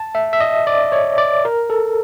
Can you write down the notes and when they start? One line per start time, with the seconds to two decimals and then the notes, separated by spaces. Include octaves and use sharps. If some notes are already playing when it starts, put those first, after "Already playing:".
Already playing: A5
0.15 E5
0.33 E5
0.40 D#5
0.67 D5
0.92 C#5
1.18 D5
1.45 A#4
1.70 A4